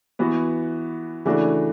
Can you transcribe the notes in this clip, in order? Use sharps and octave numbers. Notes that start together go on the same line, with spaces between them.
E3 B3 F#4
C#3 E3 A3 D4 F#4